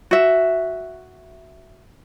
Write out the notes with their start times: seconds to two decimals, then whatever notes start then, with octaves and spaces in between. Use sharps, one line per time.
0.11 F#4 E5